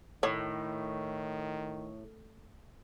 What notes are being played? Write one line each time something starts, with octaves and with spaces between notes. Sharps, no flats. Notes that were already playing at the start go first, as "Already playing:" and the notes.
A2 D#3 C#5